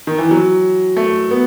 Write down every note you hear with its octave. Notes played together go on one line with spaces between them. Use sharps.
D#3
E3
F#3
A3
B3